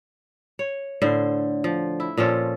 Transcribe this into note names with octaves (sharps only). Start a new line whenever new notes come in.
C#5
A2 D3 C5
F3
E4
A#2 F3 C#4 A4